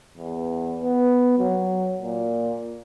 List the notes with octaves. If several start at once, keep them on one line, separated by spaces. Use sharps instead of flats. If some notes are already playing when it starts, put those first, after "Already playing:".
E2
B3
F#3
A#2